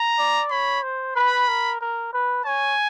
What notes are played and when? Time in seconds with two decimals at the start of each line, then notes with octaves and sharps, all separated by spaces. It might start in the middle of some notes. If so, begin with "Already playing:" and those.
Already playing: A#5
0.19 D5
0.51 C#5 B5
0.83 C5
1.16 B4 B5
1.48 A#4
1.81 A#4
2.13 B4
2.45 C#5 G#5